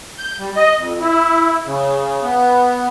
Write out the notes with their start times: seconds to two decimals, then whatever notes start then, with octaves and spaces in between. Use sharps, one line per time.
0.18 G6
0.39 G3
0.56 D#5
0.78 F2
1.00 E4
1.65 C#3
2.22 B3